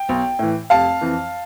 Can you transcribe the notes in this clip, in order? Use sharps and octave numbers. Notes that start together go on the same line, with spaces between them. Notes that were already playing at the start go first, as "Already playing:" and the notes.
Already playing: G5
B1
A2 E3
F1 F5 A5
F2 E3